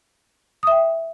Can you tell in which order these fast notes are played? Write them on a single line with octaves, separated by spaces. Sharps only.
D#6 E5 G5